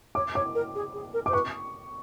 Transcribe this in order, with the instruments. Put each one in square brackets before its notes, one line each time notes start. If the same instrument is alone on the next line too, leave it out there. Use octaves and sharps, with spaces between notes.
[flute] C#5 [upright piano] D6
[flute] C#5 [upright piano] D6
[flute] A#4
G#4
G#4
A#4
[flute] C5 [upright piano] D6
[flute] B4 [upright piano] C#6